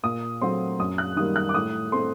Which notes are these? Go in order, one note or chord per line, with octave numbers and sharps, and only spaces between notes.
A#2 D#6
F#3 A3 C4 C6
F#2 D#6
F#6
D#3 G3 A#3 D#6
F#6
D6
A2 D#6
A3 C4 C6